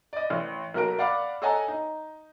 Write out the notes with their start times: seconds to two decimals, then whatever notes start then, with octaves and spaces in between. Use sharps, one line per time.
0.13 D5 D#5
0.30 A1
0.74 B1 A#3 F#4 A#4 A#5 D7
0.98 D5 F5 F#5 B5 D6
1.42 A4 C#5 D#5 F#5 G#5 A#5
1.68 D#4